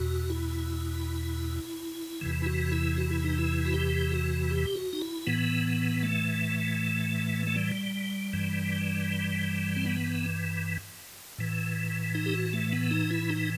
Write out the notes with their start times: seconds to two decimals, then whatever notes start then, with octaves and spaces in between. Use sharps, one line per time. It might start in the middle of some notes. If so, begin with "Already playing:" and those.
Already playing: E2 B2 F#4
0.30 E4
2.21 E2 C3 E3
2.42 E4
2.46 F#4
2.72 E4
2.97 F#4
3.11 E4
3.24 D#4
3.38 E4
3.65 F#4
3.74 G4
4.12 F#4
4.50 G4
4.75 F#4
4.93 D#4
5.01 E4
5.27 A2 E3 B3
6.03 A3
7.47 A3
7.56 G3
8.33 G2 E3
9.76 C4
9.86 B3
11.38 A2 E3
12.15 D#4
12.26 G4
12.34 F#4
12.53 A3
12.72 B3
12.91 D#4
13.11 E4
13.30 D#4